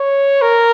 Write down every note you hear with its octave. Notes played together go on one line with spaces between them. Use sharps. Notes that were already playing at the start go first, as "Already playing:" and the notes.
Already playing: C#5
A#4